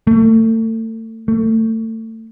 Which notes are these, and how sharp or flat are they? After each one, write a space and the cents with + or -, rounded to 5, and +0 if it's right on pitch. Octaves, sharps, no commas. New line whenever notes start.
A3 +35
A3 +30